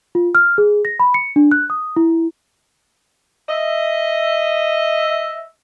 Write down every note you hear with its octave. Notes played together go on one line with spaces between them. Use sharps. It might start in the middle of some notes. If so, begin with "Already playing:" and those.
F4
F6
G#4
A#6
B5
C#7
D4
F#6
D#6
E4
D#5 E5